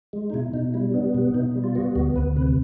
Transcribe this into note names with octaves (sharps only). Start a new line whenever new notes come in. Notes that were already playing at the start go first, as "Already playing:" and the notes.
G#3
D#4
B2 E4
B2 D#4
G3 E4
B3 D4
B2
B2 D#4
G3
F4
B3 F#4
D2 F#4
D2 B4
C3 B4